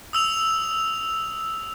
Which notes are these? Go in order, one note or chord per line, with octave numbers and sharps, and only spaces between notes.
D#6 E6 F7